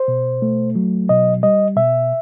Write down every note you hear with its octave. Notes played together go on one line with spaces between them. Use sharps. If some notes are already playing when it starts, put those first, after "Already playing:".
Already playing: C5
B2
A3
F#3
B2 D#5
G3 D#5
B2 E5